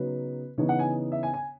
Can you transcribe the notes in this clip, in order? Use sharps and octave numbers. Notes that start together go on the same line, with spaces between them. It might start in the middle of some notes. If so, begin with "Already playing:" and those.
Already playing: C#3 F#3 B3 D#4 B4
C#3 E3 B3 D#4 C#5
F#5
G#5
E5
G#5
G#5